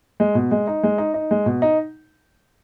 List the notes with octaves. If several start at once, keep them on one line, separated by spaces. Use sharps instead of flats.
G#3
B2
G#3
D#4
G#3
D#4
D#4
G#3
B2
D#4